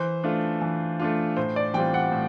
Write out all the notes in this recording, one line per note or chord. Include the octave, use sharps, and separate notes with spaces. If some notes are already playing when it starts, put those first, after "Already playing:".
Already playing: E3 C5
A3 D4 F4
E3
A3 D4 F4
A2 C5
D5
E3 G3 C4 F4 G5
F#5
A2